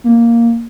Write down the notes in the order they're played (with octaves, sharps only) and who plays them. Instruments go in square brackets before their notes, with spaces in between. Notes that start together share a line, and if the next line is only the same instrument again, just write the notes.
[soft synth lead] A#3